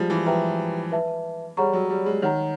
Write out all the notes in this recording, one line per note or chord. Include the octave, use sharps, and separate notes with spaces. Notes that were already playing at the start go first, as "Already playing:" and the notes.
Already playing: F3 G3 G#3
E3
F3 G4 B4 E5 G5 A#5
B4 E5 A5
G3 G#4 C#5 F#5 A#5 C#6
F#3
G3
G#3
D#3 C#5 F#5 A#5